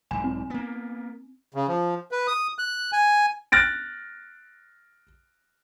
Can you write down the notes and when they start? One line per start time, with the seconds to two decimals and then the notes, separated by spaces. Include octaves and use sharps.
0.11 B1 G#2 G#5
0.24 C4
0.50 A#3 B3
1.54 C#3
1.68 F3
2.11 B4
2.27 D#6
2.58 F#6
2.92 G#5
3.52 F6 F#6 A6 A#6 D7